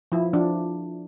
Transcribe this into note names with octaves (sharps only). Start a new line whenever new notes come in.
F3 E4
F3 D4